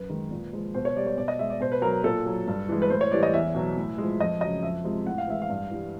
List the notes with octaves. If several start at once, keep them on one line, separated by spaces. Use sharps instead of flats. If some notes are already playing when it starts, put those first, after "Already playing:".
Already playing: F#2 B4
D#3 G#3
A#2
F3 G#3
B2 C5
C#5
G3 D5
C#5
B2 D5
D#5
G#3 E5
D5
B2 C5
B4
F#3 A#4
A#2 A4
F#3
G2
E3 G#3
B4
A2 C5
C#5
E3 G3 D5
D#5
E2 E5
B2 F#3
A2
G#3
F3
F2 D#5
C#3 F#3 D#5
F2 E5
C3 F3 G#3
A2 F#5
F5
E3 G#3 E5
F5
G2
E3 G3